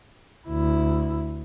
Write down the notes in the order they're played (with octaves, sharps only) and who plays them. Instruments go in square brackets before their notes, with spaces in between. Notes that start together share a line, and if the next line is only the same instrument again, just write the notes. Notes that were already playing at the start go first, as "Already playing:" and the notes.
[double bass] D2 E4